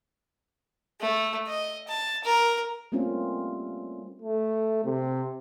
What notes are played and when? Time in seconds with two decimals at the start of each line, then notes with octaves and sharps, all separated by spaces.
1.01 A3
1.48 D#5
1.88 A5
2.24 A#4
2.92 G3 A3 A#3 C4 C#4 F4
4.22 A3
4.85 C3